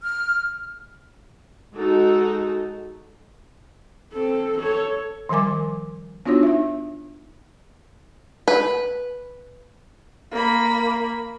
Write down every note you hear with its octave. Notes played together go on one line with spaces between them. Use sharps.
F6
G#3 D#4 F#4 A4
C4 A4
A4 C#5
D#3 F3 G3 A#4 G#5 D6
B3 D4 D#4 F4 F#4 C#5
D#4 E5
B4
A#3 B5